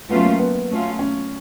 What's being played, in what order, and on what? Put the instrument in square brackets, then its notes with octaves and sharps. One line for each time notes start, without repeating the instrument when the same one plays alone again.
[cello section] F#3 A3 C#4 F4 [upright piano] B3
[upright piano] A#3
B3
[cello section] F#3 A3 C#4 F4
[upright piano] C#4